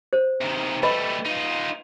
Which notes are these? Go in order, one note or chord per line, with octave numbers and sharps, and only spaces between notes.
C5
C3 D#3
G3 A3 B4 D#5 B5
D#4 F4